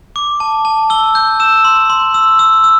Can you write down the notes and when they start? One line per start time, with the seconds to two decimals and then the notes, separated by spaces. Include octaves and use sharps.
0.16 D6
0.40 A5
0.65 A5
0.90 E6 G7
1.15 G6
1.40 E6 E7
1.65 C6
1.90 C6
2.14 E6
2.39 E6
2.64 E6